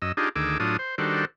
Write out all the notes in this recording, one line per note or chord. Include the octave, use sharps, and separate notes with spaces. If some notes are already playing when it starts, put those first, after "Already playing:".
F#2 D#5 E6
D4 D#4 F4 G4 G#4
D2 D#3 G#4 D6 E6
A2 F#3 D4 F4 D#6
C5
D#3 G3 D4 F#4 A4 C5